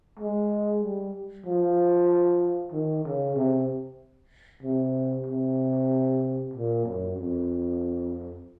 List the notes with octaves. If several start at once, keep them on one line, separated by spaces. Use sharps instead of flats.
G#3
G3
F3
D#3
C#3
C3
C3
C3
A#2
F#2
F2